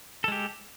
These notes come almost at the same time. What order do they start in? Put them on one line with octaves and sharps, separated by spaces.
A4 G#3 G4